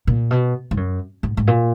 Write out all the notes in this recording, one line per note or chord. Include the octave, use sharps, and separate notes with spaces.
A#2
B2
G#2
F#2
G#2
G#2
A#2